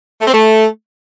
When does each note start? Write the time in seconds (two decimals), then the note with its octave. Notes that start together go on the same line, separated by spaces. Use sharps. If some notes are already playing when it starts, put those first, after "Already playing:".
0.21 A3
0.27 C4
0.34 A3